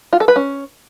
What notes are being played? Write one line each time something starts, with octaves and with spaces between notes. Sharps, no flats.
F4
A4
B4
C#4